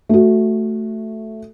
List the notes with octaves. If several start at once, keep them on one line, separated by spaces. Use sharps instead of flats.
A3 F#4